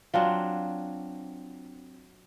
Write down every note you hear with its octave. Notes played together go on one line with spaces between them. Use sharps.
F#3 C4 D4 F4